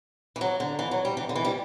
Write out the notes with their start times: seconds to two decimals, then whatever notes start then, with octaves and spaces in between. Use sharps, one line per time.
0.36 E3
0.41 F#3
0.60 D3
0.79 E3
0.91 F#3
1.05 G3
1.17 E3
1.29 D3
1.36 E3
1.45 G3